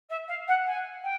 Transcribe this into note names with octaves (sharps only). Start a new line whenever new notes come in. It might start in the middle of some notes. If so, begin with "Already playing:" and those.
E5
F5
F#5
G#5
G5